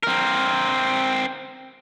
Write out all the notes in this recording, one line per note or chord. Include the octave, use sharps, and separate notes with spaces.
C4 A#4